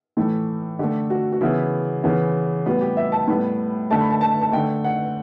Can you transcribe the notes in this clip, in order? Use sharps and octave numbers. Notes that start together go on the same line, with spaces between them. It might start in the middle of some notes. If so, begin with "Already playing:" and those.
A2 E3 A3
D3 A3 G4
F#4
F#4
C#3 E3 B3 E4
C#3 E3 B3
A2 G3 B3 F#4
G4
E5
A5
A2 G3 B3
D3 A3 A5
B5
A5
A5
A5
D3 A3 G5
F#5